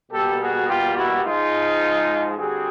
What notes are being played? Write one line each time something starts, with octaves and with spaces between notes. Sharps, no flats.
B2 G3 A#3 G4 A4
F#4 G#4
F4 G4
E4 F#4
G#2 F3 G#3 D#4 F4
D3 G3 C4 F#4 G#4